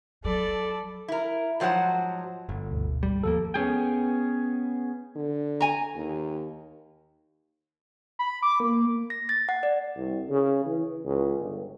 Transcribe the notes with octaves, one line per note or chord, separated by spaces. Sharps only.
F#3 A4 D5 B5
E4 A#4
G#2 F3 F#3 C5 F#5
G1
D2 G#2 B2
G3
D#2 F3 A#3 A4
B3 C#4 G#4 G5
D3
G#5 A#5
D#2
B5
D6
A#3
A#6
A6
F#5
D5
C2
C#3
E3
C#2
G1